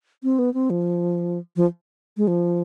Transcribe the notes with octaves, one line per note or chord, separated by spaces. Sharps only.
C4
B3
C4
F3
F3
G#3
F3